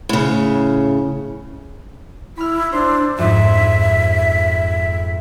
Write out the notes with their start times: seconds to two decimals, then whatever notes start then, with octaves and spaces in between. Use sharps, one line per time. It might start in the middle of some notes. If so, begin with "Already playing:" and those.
0.09 A2 C#3
2.37 E4 B5 F6
2.72 D4 C5
3.19 F2 G#2 E5